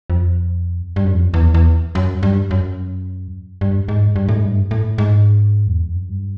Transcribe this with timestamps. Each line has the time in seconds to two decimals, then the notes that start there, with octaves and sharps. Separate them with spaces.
0.10 F2
0.96 G2
1.05 F#2
1.13 F2
1.34 E2
1.54 E2
1.95 F#2
2.23 G2
2.51 F#2
3.61 G2
3.88 G#2
4.16 G2
4.29 A2
4.35 G#2
4.43 G2
4.71 A2
4.98 G#2
5.67 E2
5.81 F2
5.94 F#2
6.09 G2